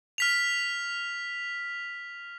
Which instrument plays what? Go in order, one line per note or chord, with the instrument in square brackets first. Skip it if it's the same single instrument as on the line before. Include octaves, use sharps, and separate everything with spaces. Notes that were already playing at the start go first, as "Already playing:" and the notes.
[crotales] F6 B6 F7